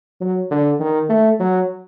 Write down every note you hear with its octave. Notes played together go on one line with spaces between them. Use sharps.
F#3
D3
D#3
A3
F#3